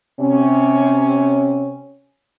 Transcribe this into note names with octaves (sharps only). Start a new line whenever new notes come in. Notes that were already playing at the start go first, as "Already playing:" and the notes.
C3 C#4